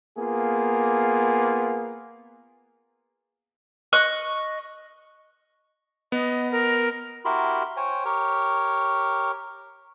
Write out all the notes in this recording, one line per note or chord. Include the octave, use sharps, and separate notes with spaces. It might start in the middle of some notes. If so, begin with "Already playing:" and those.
A#3 B3 F4 G#4
D#5 C#6 F#6
B3 D#5
A#4
E4 F#4 G4 A#4 B5 C6
C5 C#5 G5 G#5
G4 A#4 C#5